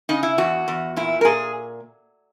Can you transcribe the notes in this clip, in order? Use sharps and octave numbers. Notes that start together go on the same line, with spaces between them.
C#3 D#4
E4
E2 F#4
E2
A#2 E4
A#4
A#2 G#4